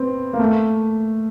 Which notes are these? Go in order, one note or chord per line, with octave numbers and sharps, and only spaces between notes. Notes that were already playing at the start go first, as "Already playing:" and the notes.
Already playing: B3 C4
A#3
A3